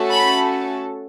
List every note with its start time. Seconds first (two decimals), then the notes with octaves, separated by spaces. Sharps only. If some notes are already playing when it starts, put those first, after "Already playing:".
Already playing: A3 C#4 F#4 A4
0.12 B5